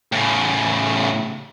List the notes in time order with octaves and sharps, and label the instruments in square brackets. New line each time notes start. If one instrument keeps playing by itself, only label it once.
[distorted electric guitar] A2 C#3